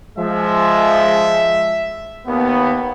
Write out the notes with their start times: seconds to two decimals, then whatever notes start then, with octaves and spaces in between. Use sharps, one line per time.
0.18 F3 G#3 E5
2.26 D#2 B3